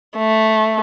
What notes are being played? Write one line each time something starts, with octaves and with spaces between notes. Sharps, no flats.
A3